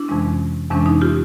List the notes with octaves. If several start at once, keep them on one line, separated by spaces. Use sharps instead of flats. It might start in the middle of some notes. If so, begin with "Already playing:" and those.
Already playing: D4 E4
F2 C3 E3 G#3 C#4
F2 C3 E3 G#3 C#4 D4
D#4
F4 G4